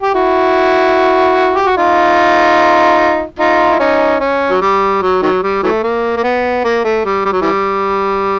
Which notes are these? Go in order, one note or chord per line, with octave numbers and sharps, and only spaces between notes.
G4
E4 F#4
G4
F#4
D#4 F4
D#4 F4
E4
C#4 D#4
C#4
F#3
G3
F#3
D#3 F#3
G3
E3 F#3 A3
A#3
A#3
B3
A#3
A3
G3
G3
F#3
E3 G3